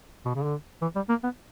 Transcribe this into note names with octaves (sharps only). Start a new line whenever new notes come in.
B2
C#3
D3
E3
G3
A#3
B3